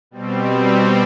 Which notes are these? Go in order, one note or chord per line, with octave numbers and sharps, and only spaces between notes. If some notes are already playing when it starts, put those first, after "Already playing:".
B2 G3 C4